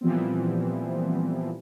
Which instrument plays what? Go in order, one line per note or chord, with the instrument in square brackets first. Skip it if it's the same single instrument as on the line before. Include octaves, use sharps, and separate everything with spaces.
[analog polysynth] A#2 E3 F3 G3 B3 C4